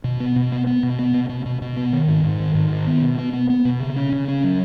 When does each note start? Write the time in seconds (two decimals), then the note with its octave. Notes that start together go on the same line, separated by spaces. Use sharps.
0.04 B2
0.20 B3
0.36 B2
0.52 B3
0.67 B3
0.83 B2
0.99 B3
1.14 B2
1.29 B2
1.46 B2
1.62 B2
1.77 B3
1.93 D#3
2.08 G#2
2.24 G#2
2.40 D#3
2.55 G#2
2.71 D#3
2.87 B3
3.02 B2
3.18 B3
3.33 B3
3.50 B3
3.65 B2
3.80 C#3
3.96 C#4
4.13 C#3
4.28 C#4
4.44 F#3